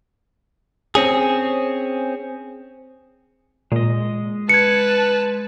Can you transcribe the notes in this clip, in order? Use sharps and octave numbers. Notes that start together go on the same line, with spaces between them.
C4 C#4 G#4
A#2 G#3 D#5
B4 A5 G#6 C#7